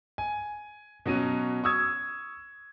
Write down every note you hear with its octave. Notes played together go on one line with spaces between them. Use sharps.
G#5
B2 F#3 C#4 D#7
C#6 D#6 E6 G#6